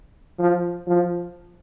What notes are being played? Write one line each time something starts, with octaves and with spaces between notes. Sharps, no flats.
F3
F3